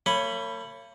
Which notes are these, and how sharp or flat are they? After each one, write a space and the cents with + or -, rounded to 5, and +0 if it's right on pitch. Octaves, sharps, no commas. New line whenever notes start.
A#3 -45 C#5 +0 B5 +0